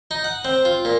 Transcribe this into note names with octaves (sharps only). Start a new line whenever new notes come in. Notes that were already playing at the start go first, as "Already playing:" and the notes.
D#4
F#5
C4
F4
A#2